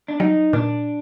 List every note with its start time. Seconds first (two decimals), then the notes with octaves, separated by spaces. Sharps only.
0.08 D4
0.20 F#3 D#4
0.53 A#2 D4